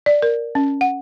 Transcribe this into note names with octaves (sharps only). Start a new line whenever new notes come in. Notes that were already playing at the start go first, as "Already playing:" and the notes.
D5
A#4
C#4
F#5